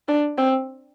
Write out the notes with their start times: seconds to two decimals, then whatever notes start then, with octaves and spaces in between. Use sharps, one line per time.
0.08 D4
0.37 C4